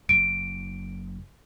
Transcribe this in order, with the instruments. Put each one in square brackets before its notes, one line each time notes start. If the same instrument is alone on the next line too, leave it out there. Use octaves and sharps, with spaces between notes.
[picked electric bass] F#1 [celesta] D7